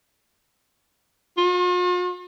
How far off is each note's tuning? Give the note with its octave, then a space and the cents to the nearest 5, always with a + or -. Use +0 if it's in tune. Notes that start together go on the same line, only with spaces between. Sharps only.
F4 +45